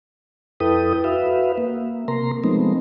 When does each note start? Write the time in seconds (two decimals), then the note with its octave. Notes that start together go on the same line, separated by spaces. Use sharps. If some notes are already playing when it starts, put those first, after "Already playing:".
0.60 F2 E4 A4 B4 G5 D#6
1.04 F#4 B4 E5 F5
1.58 A#3
2.08 C3 A#3 A#4 A#5 C6
2.44 F3 G#3 A3 B3 C4 D#4